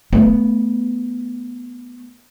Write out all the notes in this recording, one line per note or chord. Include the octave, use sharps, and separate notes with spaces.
A3 B3